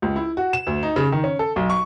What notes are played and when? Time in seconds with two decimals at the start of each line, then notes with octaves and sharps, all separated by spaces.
0.02 C#2
0.16 E4
0.37 F#4
0.53 E7
0.67 D2
0.83 D#4
0.96 C#3
1.12 D#3
1.24 C#4
1.39 A4
1.56 B1
1.70 C#6